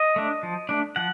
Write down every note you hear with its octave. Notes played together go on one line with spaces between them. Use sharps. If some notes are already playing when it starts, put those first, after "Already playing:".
Already playing: D#5
A3 D4
F3
A3 D4
F3 F#5